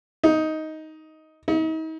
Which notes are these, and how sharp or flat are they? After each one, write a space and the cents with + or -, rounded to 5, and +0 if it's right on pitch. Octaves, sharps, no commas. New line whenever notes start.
D#4 +10
D#4 +40